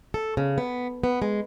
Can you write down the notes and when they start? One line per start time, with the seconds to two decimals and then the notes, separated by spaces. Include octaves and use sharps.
0.14 A4
0.37 C#3
0.58 B3
1.04 B3
1.22 G#3